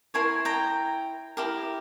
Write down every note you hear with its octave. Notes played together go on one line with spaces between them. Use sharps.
E4 A#4 C#5 G#5 C6
G5 A#5
E4 G4 A#4